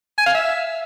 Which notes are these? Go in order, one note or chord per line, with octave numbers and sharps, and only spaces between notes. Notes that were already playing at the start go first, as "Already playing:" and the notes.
G#5
F5
E5